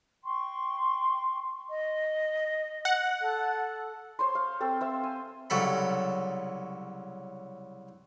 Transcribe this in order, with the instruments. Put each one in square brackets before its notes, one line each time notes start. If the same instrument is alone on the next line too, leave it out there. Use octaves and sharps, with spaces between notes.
[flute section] G5 C6 C#6
[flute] D#5
[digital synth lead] F#5
[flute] A4
[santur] C5 C#5 C6
F5
C4 A4
C5 E5 F5
G#5
[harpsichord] C2 C#3 F#3 A4 B5